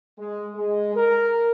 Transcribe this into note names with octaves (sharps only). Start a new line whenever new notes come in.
G#3
G#3
A#4